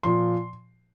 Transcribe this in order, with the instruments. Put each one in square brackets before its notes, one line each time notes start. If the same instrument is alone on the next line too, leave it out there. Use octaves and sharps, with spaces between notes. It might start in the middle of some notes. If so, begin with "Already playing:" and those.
[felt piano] A#2 F3 C6